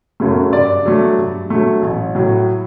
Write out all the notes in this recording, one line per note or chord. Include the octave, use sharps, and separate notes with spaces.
F#2 C#3 F#3 A3
G2 D5
F#3 A3
G2
F#3 A3
A1
A2 F#3